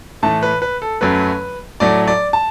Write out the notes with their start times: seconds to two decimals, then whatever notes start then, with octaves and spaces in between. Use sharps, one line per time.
0.23 A2 E3 A3 A5
0.43 B4
0.62 B4
0.82 A4
1.01 F#2 F#3 A3 B4
1.80 A2 F#3 A3 D5
2.07 D5
2.33 A5